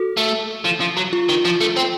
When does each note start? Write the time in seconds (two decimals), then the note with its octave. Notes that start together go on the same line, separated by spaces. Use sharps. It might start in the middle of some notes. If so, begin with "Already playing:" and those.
Already playing: F#4 A4
0.17 A3
0.64 F3
0.80 F3
0.97 F#3
1.13 F4
1.29 D#3
1.45 F3
1.60 A3
1.76 C4